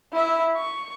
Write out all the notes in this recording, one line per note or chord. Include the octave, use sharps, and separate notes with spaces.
E4 E5
C#6